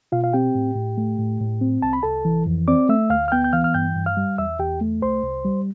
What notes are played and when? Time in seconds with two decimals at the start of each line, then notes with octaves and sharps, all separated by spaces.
0.12 B2 F4 F5
0.24 F5
0.33 C4 G4 G5
0.55 A2
0.76 A2
0.97 A3
1.19 A2
1.40 A2
1.61 C4
1.82 C2 A5
1.93 B5
2.03 C2 A4 A5
2.25 E3
2.46 F2
2.68 C4 D5 D6
2.89 A3 E5 E6
3.10 D2 F5 F6
3.28 F6
3.32 B3 G5 G6
3.44 G6
3.53 E3 F5 F6
3.64 F6
3.74 G2 G5 G6
3.96 G2
4.06 F5 F6
4.17 G3
4.38 E2 E5 E6
4.59 E2 G4 G5
4.81 A3
5.02 C2 C5 C6
5.23 C2
5.45 G3